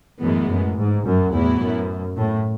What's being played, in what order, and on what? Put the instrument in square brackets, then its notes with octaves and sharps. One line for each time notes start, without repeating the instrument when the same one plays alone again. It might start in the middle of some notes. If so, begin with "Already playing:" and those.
[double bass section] F#2 [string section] A2 E3 G#3 B3
[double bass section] F#2
G#2
F#2
[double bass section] E2 [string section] A2 F#3 B3 E4
[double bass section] F#2
A2